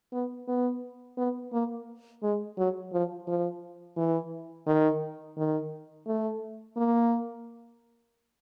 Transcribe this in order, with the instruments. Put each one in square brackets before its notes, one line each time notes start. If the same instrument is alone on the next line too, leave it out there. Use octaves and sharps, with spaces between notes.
[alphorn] B3
B3
B3
A#3
G#3
F#3
F3
F3
E3
D#3
D#3
A3
A#3